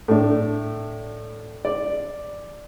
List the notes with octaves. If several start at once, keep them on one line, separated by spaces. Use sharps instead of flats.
A2 D4
D5